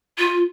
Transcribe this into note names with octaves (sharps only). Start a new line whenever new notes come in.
F4